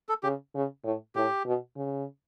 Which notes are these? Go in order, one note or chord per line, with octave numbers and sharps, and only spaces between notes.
A4
C#3 G4
C#3
A2
A2 G4
B2
C#3